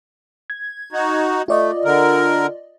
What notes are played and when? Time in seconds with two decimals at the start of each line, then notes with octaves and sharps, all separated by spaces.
0.50 G#6
0.93 D#4 F#4
1.48 A3 F4 D5 D#5
1.85 D3 A#4